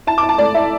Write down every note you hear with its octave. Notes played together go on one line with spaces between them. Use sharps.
E4 A5
E4 D6
A5
A3 D5
E4 E5